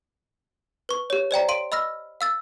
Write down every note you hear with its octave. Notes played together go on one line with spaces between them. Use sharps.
B4 C#6
G4 C#5
C5 D5 G5 A#5
F5 C6 D7 D#7
D#5 B5 E6 F6 A#6
F5 E6 A6